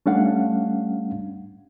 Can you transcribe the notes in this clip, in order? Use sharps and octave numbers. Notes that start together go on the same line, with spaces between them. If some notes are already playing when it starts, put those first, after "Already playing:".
G3 A3 C#4 D4 F5 F#5